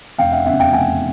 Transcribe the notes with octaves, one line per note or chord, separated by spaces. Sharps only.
F1 F5 G5
E5 F#5
E2 C#3 E5 F#5
F5 G5
F1 F#5 G#5